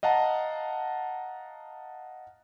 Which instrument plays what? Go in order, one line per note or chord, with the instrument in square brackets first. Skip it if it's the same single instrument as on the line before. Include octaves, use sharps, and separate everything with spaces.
[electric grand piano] D#5 F5 F#5 A5 A#5